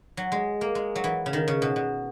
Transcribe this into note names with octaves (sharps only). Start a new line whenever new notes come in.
F#3
G#3
A#3
G#3
F#3
E3
C#3
D#3
C#3
B2
B2